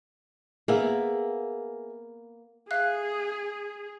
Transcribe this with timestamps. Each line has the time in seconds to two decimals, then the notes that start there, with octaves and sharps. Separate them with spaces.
0.68 A#3 B3 G#4 E5
2.71 G#4 E5 F5 F#6